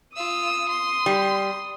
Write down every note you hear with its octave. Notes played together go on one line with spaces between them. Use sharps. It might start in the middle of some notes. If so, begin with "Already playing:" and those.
F4 D#6 E6
C6
G3